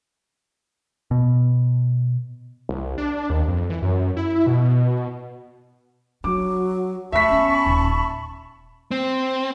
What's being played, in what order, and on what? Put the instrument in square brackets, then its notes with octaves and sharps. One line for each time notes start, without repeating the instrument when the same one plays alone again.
[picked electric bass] B2
[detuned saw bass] C2
D4
D#2
F2
E3
F#2
E4
B2
[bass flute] F#3 [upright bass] D4 [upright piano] D6
[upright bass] D#2 A3 [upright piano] E5 B6 [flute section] A5 B5 C#6
[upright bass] E3 B3 [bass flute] C#4
[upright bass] D#1
[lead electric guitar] C4